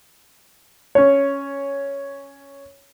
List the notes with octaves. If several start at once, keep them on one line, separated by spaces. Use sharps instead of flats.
C#4 C#5